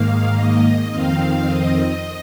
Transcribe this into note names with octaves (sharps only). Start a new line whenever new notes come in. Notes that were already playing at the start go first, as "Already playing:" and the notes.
Already playing: G#2 D#3 A#3 F5
D#5
F2 D#3 C4 F5
F5
D#5